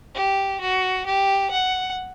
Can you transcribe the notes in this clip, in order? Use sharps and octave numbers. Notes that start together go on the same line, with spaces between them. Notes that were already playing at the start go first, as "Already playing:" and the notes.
G4
F#4
G4
F#5